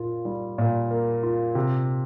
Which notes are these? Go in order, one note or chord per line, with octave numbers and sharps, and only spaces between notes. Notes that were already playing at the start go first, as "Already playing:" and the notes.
Already playing: A#2 A#3 F4
G3
A#2
A#3
F4
C3